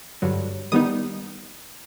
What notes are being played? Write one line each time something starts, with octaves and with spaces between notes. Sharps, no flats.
G2 D3 F#3
D#3 G3 B3 D#4 D#6